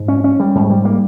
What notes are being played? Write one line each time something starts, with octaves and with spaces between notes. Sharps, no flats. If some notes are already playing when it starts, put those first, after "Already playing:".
Already playing: G#2
C#4
C#4
G3
G#2
G3
A#3